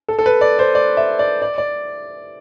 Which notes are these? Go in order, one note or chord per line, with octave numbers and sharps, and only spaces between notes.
A4
A4
B4
D5
C5
D5
E5
D5
D5
D5